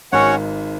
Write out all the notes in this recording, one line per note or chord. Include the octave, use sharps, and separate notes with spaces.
G#1 G#2 C#4 F#4 C#5 F#5